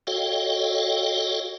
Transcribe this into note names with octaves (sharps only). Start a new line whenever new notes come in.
F#4 A4 C#5 D#5 F5 G5